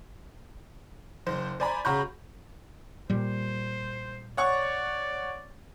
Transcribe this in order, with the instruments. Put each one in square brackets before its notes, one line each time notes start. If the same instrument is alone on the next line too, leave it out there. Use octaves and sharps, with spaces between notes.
[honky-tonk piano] F#1 C5
C5 D5 G#5 A#5 B5
C#3 F#4 A#5 B5 C#6 G6
[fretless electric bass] A#2 G3 [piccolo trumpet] C5
[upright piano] C#5 F#5 C#6 [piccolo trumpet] D5